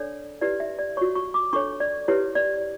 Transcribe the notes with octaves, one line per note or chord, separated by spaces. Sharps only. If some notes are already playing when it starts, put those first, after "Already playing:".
Already playing: D4 A4 C#5 D5
E4 G4 B4 D5
E5
D5
F#4 C#5 C#6
C#6
D6
D4 A4 C#5 C#6
D5
E4 G4 B4 C#5
D5